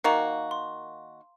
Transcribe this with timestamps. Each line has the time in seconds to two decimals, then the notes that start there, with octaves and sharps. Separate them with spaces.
0.04 D#3 A#3 F#4 F5 A#5
0.51 C6